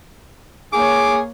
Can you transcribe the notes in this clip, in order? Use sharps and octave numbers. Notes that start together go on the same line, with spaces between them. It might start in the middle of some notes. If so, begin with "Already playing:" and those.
A#3 G#4 C#5 D6